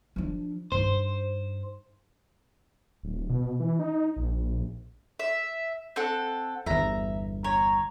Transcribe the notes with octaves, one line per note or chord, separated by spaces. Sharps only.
F3 D4
G2 D#4 C5
D1
B2
E3
D#4
A#1
E5
C4 A4 F#5
G1 E2 E5 A#5
C#5 A#5